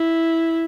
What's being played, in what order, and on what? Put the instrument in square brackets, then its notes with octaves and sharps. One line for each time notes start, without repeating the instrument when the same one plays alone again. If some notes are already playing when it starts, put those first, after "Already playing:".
Already playing: [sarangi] E4